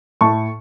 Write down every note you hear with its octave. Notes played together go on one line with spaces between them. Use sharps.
A2 A5 C#6